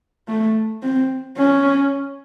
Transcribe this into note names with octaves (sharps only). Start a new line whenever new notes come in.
A3
C4
C#4